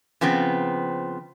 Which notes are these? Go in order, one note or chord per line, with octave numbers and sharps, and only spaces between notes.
C#3 F3 B3 C4